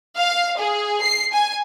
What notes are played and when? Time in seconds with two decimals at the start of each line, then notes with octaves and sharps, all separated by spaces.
0.17 F5
0.58 G#4
1.03 C7
1.32 G#5